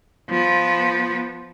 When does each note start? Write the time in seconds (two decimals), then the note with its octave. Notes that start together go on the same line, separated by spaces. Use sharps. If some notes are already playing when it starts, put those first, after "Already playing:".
0.30 F3 B3